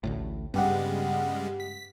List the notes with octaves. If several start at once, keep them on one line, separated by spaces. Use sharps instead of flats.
A1 D2 A2
G2 C#3 G3 G#3 B3 G4 F#5
B6